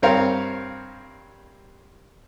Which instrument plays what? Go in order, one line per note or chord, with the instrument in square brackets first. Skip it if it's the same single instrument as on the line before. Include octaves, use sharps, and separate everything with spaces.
[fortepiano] G2 C4 A#4 C#5 F5